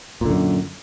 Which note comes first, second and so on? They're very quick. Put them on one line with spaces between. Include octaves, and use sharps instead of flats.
A#2 D3 F#2